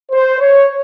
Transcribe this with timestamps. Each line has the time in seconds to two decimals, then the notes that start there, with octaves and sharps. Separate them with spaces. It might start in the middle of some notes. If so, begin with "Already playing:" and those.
0.11 C5
0.39 C#5